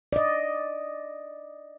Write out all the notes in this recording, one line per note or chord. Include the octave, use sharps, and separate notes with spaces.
D5 D#5